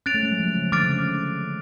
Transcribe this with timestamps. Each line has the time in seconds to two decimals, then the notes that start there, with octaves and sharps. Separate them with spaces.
0.06 C#4 F#6 A6 D7 F7
0.14 A3
0.23 G#3
0.31 F#3
0.40 F3
0.56 C#3
0.72 D3 D6 F6 A6 D7
0.83 C#3
0.94 D3